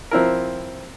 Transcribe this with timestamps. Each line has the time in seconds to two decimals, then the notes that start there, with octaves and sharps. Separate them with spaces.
0.11 F3 C4 E4 A#4